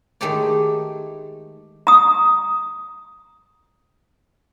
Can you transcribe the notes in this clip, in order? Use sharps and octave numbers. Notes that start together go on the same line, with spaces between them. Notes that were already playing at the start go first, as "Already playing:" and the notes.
D#3 G#3 A3 G4 C#5 D5
A#5 D#6